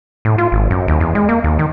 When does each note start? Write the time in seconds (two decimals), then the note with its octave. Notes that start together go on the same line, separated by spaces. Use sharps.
0.25 A2
0.38 F4
0.52 G#1
0.71 F#2
0.88 D#2
1.00 E2
1.15 G#3
1.29 A#3
1.44 D#2
1.59 D#3